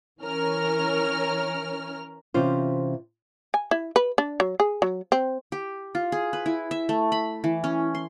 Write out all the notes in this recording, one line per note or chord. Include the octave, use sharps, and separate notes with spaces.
E3 C#4 A#4 F6
C3 E3 C#4 F4 C5
G#5
E4
B4
D4
F#3
G#4
F#3
C4
G4
F4
G#4
B4
E4
E5
A3
B5
E3
C#4
C6